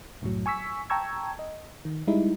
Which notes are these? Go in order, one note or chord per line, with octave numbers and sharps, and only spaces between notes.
C2 F#2 A2 F#3
G#5 C#6 E6 B6
G5 A5 A#5 C#6 E6 G#6
D#5
D#3
G3 G#3 D#4 E4